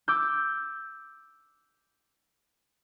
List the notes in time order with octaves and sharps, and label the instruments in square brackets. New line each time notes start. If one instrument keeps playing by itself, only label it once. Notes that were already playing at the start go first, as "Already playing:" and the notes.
[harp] D6 E6 G6